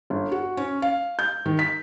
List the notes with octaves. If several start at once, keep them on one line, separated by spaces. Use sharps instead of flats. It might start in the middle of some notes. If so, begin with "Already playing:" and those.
G1
F#4
C#4
F5
G6
D#3
B6